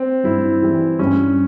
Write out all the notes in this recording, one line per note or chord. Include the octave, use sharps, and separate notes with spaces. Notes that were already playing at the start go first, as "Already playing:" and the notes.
Already playing: C4
G2 E4
E3 G3
G2 C#4